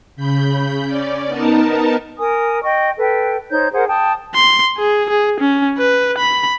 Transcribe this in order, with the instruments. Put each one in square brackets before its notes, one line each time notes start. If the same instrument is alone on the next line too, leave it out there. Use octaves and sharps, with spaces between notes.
[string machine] C#3 B5 G6
C#4 D5
B3 D#4 A#4 A5
[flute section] A#4 G#5 D#6
D#5 G5 C#6
A4 B4 G5
D#4 C5 C#5 G6
G#4 A#4 C5 F#5
G5 A5 D#6
[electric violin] C6
G#4
G#4
C#4
B4
B5